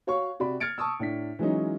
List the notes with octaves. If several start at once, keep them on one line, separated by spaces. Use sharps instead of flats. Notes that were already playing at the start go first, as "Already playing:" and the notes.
F#4 C#5 F5 C#6
C3 F#4 D5 B5
F6 G#6 A6 C#7 D7
A5 C#6 D#6 E6
A2 D4 B6
E3 F#3 G#3 C#4 D#4